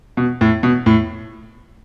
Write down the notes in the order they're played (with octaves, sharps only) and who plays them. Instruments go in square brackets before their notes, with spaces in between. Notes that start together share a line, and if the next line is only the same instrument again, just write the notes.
[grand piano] B2
A2
B2
A2